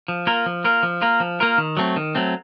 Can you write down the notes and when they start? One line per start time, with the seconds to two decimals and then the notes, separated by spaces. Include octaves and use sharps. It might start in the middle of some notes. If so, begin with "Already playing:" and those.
0.08 F3
0.27 A#3 F4 A#4
0.46 F3
0.64 A#3 F4 A#4
0.83 F3
1.02 A#3 F4 A#4
1.20 F3
1.40 A#3 F4 A#4
1.58 D#3
1.77 F#3 A3 C4
1.96 D#3
2.15 F#3 A3 C4